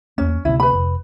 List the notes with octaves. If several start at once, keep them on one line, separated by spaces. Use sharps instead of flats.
E2 A#3 C#4
D2 C3 E4
B4 B5
F1